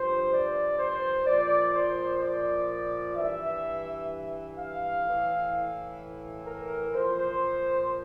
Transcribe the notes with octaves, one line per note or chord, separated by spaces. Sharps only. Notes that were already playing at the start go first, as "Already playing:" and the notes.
Already playing: G2 F3 C5
D5
C5
A#2 F3 D5
C5
D5
G2 E3 E5
F5
A2 E3
A#4
A#2 F3 C5